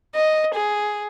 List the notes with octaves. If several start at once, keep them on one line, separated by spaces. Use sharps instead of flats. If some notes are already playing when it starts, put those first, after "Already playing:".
D#5
G#4